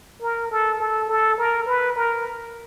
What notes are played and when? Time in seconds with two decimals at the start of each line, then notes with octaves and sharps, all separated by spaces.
0.22 A#4
0.51 A4
0.80 A4
1.09 A4
1.38 A#4
1.66 B4
1.96 A#4